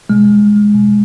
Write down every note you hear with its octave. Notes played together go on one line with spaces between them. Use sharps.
B2 G#3
B2